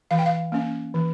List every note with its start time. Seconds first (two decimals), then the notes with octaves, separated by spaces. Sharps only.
0.11 E3 F5
0.19 G5
0.26 F5
0.52 A#3 C#4
0.94 E3